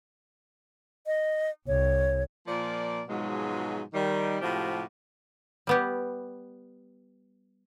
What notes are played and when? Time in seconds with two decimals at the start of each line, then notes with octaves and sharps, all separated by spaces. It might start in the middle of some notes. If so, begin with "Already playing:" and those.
1.06 D#5
1.67 C2 C#5
2.47 A#2 F3 A#3 D5
3.08 G#2 B2 F3 F#3 G#3
3.94 D#3 G3
4.41 A2 C3 F3 G#3 F#4 G4
5.67 G3 B3 G4